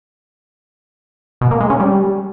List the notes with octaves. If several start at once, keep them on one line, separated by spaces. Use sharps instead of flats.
B2
A#3
G#3
C#4
G3